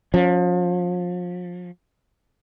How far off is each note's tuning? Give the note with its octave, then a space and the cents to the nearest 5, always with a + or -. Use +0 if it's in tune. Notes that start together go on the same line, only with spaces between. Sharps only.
F3 +30 C#4 +0